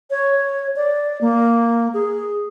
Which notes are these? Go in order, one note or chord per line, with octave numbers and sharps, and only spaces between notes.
C#5
D5
A#3
G#4